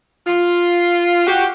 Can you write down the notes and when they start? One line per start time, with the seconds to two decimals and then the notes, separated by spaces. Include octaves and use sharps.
0.27 F4
1.26 F#4 G4